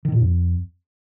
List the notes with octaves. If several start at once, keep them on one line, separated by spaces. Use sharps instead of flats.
D#3
A#2
F2